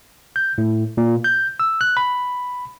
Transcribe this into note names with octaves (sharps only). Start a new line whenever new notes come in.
G6
A2
A#2
G6
E6
F#6
B5